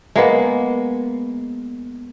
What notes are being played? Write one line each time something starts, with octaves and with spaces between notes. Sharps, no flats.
G#3 A#3 B3